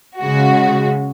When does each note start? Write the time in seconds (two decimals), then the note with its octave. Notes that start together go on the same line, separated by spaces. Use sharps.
0.19 C#3 G#3 F#4